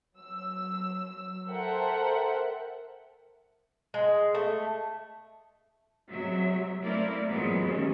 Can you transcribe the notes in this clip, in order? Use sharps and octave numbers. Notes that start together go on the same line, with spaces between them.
F#3 E6
A4 A#4 C5 E5 F#5 G5
G#3
A3
C3 F#3 G#3 E5
A3 A#3 C4 E4 A#4 D5
A#2 E3 F#3 G#3 B3 C4
D#2 E3 C#4